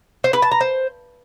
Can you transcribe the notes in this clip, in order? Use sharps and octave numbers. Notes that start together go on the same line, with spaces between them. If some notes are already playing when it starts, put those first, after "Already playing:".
C5
B4
A5
A#5
C5